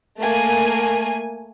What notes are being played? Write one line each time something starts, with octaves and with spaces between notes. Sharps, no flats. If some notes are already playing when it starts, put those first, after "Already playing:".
A3 A#3 G#5